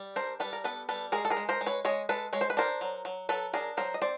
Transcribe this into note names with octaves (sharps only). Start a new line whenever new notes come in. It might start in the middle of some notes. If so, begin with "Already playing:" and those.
Already playing: G3
D4 A#4 C5
G3 A4 B4
A#4
B3 A4 B4
G3 A4 B4
G#3 G#4 A#4
A4
G#4 A#4
G#3
A#4 C5
G#3
B4 C#5
G#3 C#5 D#5
G#3 A4 B4
G#3 C#5
C5
B4
D4 A#4 C5
F#3
F#3
F#3 A4 B4
D4 G#4 A#4
F#3 A#4 C5
D#5
C4 C5 D5